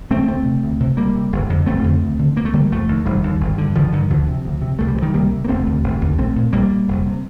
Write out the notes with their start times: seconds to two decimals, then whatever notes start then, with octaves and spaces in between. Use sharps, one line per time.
0.10 C3 A3 C4
0.27 D2 A3 C4
0.45 C3
0.63 D2
0.80 C3
0.97 D2 G3 A#3
1.15 C3
1.32 G1
1.50 F2 D3
1.66 G1 A3 C4
1.84 F2 D3
2.02 D2
2.19 D3
2.36 D2 A#3
2.45 A3
2.53 D3 G3 A#3
2.70 F1 F3 A3
2.88 D#2 D3
3.05 F1 D#3 G3
3.23 D#2 D3
3.40 G1
3.58 G2 D3
3.75 G1 D3 F3
3.92 G2 D3 D#3
4.10 D2 D3 F3
4.28 C3
4.45 D2
4.62 C3
4.79 C2 A3
4.88 G3
4.95 C3 F3
5.02 D#3 G3
5.14 C2 G3 A#3
5.31 C3
5.45 A#3
5.48 F1 A3 C4
5.66 D#2 D3
5.84 F1
6.01 D#2 D3
6.18 A#1 A3 C4
6.36 A#2
6.53 A#1 G3 A#3
6.70 A#2
6.88 F1
7.07 C3